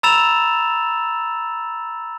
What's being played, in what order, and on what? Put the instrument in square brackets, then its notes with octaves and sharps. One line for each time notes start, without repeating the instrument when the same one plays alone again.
[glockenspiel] A#5 B5 E6 A6 E7 F7